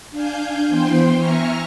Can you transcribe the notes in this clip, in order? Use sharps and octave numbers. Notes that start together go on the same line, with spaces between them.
D4 F5 G#5 G6
E3 B3 C5 G5 C6
E5 G#5 A#5 C#6 F6